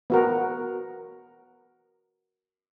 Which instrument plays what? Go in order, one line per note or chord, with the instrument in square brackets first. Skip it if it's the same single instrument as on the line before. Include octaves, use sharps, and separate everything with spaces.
[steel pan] B3 F#4 A#4